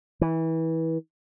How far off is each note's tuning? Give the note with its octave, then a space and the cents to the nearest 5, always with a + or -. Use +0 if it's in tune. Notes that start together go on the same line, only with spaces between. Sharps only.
E3 -25